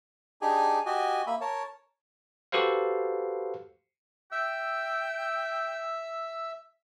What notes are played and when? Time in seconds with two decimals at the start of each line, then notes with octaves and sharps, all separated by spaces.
0.42 D4 D#4 G4 G#4 G#5
0.86 F#4 G4 D#5 G#5
1.27 A#3 E5 B5
1.41 A#4 C#5 A5
2.52 F#4 G4 A4 B4 C5 F5
4.32 E5 G5 E6